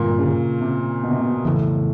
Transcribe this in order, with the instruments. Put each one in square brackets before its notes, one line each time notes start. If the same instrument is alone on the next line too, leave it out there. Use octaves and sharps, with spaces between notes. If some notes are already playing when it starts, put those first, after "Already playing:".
Already playing: [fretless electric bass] G2 D3 G3 C4 [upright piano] A#2
[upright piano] C#3
C3
B2
C3
B2
[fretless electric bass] F2 C#3 E3 [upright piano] A2